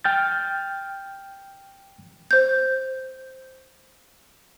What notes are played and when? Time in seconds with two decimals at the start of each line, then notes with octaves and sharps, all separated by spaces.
0.05 G5 F6 G6 A6
2.31 C5 G6